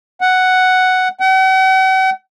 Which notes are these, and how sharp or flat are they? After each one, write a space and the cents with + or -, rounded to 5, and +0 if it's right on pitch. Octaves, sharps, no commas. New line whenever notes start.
F#5 +5
F#5 +45